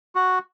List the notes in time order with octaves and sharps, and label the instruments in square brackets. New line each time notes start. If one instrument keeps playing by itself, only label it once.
[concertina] F#4